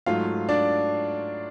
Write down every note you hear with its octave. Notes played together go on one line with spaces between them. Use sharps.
G#2 F#3 A3 F4 F5
D4 D5